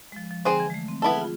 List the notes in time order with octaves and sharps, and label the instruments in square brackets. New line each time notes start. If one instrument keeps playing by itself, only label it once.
[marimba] G#3
F3
F3
[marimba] D3 [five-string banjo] C4 G#4 C5
[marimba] E3
G#3
A3
C4
[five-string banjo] B3 E4 A4
[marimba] G#4
F4